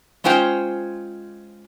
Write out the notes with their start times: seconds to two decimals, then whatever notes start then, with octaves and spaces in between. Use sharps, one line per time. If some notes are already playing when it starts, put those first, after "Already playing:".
0.24 G#3 C#4 F4 C5 G5